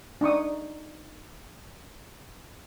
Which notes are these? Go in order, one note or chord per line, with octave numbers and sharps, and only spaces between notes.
D4 D#4 C#6 D#6